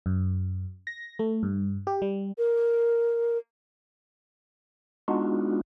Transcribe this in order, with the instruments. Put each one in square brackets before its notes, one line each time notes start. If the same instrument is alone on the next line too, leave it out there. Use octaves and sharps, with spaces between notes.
[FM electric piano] F#2
A#6
A3
G2
G4
G3
[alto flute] A#4
[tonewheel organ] G#3 B3 D4 D#4 F4 F#4